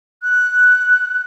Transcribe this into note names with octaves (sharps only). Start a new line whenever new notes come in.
F#6